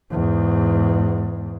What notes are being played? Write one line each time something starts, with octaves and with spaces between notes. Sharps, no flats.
E2 G#2